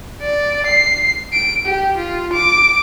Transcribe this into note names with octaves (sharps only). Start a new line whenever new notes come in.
D5
C7
D7
G4
F4
D6